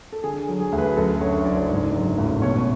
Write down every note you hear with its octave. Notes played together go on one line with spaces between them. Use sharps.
A4
D3 G#4
F#3
G#4
D2
B4
F#2 A4
D3 C#5
F#1 D5
G#2
F#3
A1
B2 C#5